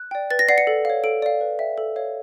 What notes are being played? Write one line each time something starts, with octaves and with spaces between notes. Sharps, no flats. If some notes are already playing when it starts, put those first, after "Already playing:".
Already playing: F#6
D5 G5
B4 A6
A#6
D5 F#5 C7
C#7
A4
C#5 F5
A4 D7
D5 F5
B4
E5 G5
A4
C#5 F5